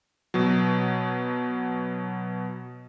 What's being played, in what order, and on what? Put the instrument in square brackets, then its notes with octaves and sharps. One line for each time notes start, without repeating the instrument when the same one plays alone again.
[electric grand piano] B2 F#3